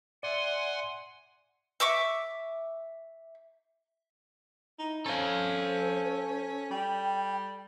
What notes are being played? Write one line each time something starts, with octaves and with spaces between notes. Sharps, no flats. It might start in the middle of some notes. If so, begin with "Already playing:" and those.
D5 E5 F#5 G#5 C6
E5 C#6 D6 E6
D#4 E4
C#4 A4 C5 F5
G3 G5